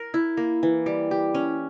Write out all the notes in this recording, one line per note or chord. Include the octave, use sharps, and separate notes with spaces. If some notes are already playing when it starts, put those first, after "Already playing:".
Already playing: A#4
E4
A#3
E3
G3
G4
C#4